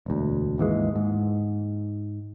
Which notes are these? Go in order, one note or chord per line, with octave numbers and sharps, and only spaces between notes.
E1 D2
G#1 D#2 E3 G#3
G#2